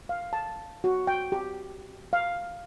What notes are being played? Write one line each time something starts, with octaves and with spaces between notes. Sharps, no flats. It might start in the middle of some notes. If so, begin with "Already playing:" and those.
F5
A5
F#4
G5
G4
F5